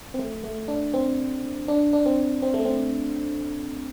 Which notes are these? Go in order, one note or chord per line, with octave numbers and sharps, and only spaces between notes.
C4
A3
A3
D4
C4
D4
D4
C4
C4
A3
C4